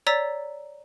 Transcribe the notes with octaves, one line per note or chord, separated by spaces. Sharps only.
C#5 D5 A#5 E6 A6 B6